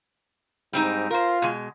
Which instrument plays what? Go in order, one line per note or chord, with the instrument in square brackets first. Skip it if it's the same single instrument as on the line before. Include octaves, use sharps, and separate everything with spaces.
[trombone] G#2 [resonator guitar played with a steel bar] G3 C4 D#4
[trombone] F4 [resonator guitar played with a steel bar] A#4 C5
[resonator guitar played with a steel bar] B2 G#3